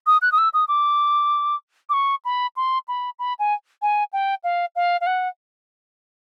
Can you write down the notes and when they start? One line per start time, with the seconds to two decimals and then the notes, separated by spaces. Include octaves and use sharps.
0.07 D#6
0.22 F#6
0.32 D#6
0.38 E6
0.54 D#6
0.68 D6
1.89 D6
1.93 C#6
2.25 B5
2.57 C6
2.88 B5
3.19 B5
3.39 G#5
3.82 G#5
4.13 G5
4.44 F5
4.76 F5
5.01 F5
5.07 F#5